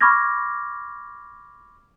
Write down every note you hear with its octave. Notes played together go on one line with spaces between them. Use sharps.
B5 C#6 D6 F6 G#6 A#6